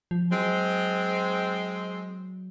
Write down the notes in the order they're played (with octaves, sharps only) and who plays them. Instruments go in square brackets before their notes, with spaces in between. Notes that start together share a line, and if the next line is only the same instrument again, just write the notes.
[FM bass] F3
[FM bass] F#3 [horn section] G#3 C4